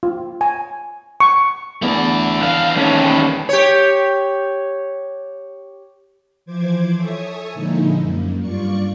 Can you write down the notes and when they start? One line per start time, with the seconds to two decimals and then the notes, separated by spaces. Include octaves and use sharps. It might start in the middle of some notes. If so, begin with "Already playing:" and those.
0.03 F4
0.41 G#5
1.20 C#6
1.82 E2 A3 D4
2.43 B3 D4 F5
2.76 D#3 G#3 C#4 A4
3.49 G4 C#5
6.45 E3 F3 C5 D6 G#6
6.96 A4 C#5 E5 G#5 C#6 D#6
7.53 A#2 D3 F3 G#3 D#4 E4
7.99 F#2 A#3
8.40 G2 F4 D5 C#6 C#7